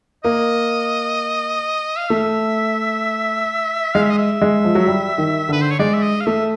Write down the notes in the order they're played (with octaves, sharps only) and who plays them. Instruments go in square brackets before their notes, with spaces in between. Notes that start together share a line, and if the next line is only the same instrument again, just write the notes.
[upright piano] A#3 [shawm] D#5
[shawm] F5
[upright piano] A3 [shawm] E5
[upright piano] G#3 [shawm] F5
[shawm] E5
D#5
E5
[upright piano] G#3
F3
F#3
G3
D#3
[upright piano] D3 [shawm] B4
[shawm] C5
C#5
[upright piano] G#3 [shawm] D5
[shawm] E5
D#5
F5
[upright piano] A3 [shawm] E5